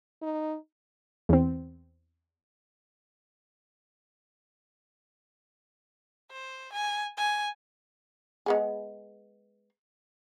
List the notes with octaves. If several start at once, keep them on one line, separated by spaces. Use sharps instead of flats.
D#4
E2 C4
C5
G#5
G#5
G#3 B3 G#4